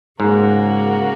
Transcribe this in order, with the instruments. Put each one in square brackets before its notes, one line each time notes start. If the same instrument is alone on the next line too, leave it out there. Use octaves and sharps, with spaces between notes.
[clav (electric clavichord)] G#2 [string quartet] C#3 A#3 F#4